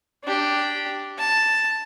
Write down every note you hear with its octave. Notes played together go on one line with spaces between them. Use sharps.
D4 G4
A5